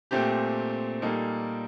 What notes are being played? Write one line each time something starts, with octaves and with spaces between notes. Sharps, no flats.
A#2 A3 C4 G4
A#2 G3 A#3 D#4 A4